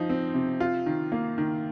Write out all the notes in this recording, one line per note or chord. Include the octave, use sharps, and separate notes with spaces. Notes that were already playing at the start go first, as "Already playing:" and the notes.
Already playing: F3 D#4
C4
C3
F4
D#3
A#3
D#3